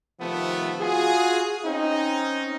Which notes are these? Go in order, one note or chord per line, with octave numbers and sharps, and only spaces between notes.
C3 D#3 F3 A3 B3
F4 F#4 G#4
C4 C#4 D#4